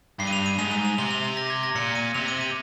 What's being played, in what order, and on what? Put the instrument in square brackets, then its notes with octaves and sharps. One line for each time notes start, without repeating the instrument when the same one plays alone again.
[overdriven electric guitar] G2 [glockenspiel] C7
[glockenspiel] D#7
F7
D#7
[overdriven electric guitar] G#2 [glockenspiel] F7
[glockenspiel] F7
F7
[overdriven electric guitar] C3 [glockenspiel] G7
[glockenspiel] F7
F7
A#6
G#6
A#6
[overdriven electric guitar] A#2 [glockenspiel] C#7
[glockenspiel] D#7
[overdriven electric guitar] C3 [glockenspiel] F7
[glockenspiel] D#7
D#7